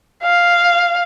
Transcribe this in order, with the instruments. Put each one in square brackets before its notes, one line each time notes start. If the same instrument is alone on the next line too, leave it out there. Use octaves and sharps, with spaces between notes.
[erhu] F5